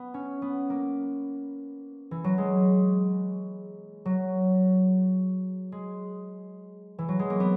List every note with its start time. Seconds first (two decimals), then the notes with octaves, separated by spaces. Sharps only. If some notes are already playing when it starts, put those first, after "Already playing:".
Already playing: B3
0.14 C#4
0.42 B3
0.70 A#3
2.11 E3
2.24 F#3
2.38 G#3
4.05 F#3
5.72 G#3
6.99 E3
7.09 F#3
7.19 G#3
7.30 A#3
7.40 B3